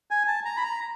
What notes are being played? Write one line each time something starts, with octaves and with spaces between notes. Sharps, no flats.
G#5
A5
A#5
B5
A#5